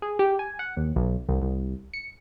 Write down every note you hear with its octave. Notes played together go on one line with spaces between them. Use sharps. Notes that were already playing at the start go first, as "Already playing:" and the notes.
G#4
G4
G#5
F#5
D#2
B1
C2
C2
C#7